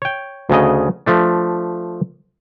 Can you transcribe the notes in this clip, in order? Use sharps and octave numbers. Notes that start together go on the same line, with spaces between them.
C#5 G5
D2 C#3 D#5
F3 A3 D4